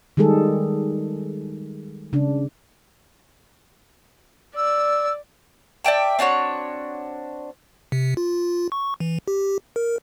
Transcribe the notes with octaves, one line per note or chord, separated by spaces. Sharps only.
D#3 G3 G#3 G#4 A4
C#3 D4
D5 E6
D5 E5 G5 A5
C4 D4 F#4 C#5
C3
F4
C#6
E3
G4
A#4